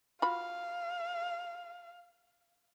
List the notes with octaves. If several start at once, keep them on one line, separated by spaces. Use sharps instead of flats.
F4 F#4 F5 B5